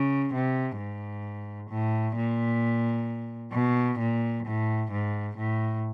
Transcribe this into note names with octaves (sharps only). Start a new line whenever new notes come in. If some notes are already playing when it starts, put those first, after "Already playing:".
Already playing: C#3
C3
G#2
A2
A#2
B2
A#2
A2
G#2
A2